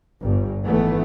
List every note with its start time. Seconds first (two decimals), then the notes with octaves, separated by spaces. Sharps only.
0.23 G1 G2
0.66 G#1 E3 A3 B3